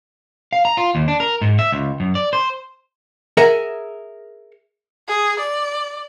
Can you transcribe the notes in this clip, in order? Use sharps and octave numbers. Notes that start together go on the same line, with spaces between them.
F5
A#5
F4
D#2
D4
A#4
G#2
E5
C#2
F#2
D5
C5
G#4 A#4 E5 F#5
G#4
D5